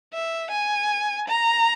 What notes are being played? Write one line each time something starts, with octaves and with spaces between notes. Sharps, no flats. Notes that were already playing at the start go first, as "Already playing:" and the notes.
E5
G#5
A#5